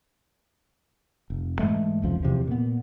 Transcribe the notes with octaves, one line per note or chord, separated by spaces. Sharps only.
F1
G#2 E3 G#3 A3
F1 C#2 F3
E2 C3 F3
A#2 B3